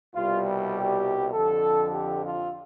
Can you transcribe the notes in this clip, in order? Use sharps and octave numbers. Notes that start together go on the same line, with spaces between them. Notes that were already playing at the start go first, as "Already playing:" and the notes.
C2 B2 G3 F4
G4
F2 D3 F3 A4
G4
F4